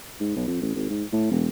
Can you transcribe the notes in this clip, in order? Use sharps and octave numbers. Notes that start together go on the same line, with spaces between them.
G#2
B1
F2
A1
G#1
G#2
A2
E1